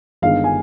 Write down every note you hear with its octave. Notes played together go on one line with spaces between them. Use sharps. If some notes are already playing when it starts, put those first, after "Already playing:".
G1 G2 D#3 G#3 F5
G#5